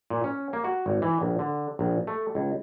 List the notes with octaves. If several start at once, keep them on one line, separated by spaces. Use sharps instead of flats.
A#2
C#4
A#3
F#4
G#1
E3
A#1
D3
A#1
A3
C#2